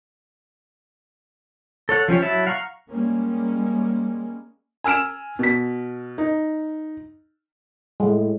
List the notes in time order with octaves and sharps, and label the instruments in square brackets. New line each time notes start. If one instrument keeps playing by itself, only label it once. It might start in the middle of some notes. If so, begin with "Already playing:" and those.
[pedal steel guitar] A4 C#5 F#5
F3 C#4 G4 C#5
F#3 E4 E5 A5
F5 F#5 A#5 C#6
[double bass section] G3 G#3 A#3 C#4
[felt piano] G#5 E6 F6 D7 E7
B2 B6
D#4
[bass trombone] A2 [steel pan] G#3